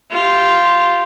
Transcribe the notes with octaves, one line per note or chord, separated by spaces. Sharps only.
F4 G4